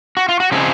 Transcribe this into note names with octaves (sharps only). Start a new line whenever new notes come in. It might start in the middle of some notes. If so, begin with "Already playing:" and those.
F#4
F4
F#4
C#3 F3 C4 D#4 G#4